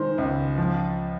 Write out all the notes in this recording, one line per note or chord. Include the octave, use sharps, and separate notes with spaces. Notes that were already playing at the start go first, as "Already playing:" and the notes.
Already playing: D#3 G#3 C5
C#2
F3